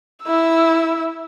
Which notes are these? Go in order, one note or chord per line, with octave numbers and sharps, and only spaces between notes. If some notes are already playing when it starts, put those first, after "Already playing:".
E4 E6